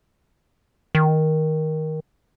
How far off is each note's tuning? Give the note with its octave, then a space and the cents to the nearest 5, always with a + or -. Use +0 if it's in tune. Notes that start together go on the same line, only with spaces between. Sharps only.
D#3 +10